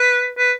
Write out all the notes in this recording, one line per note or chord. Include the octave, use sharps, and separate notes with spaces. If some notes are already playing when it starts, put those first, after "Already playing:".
Already playing: B4
B4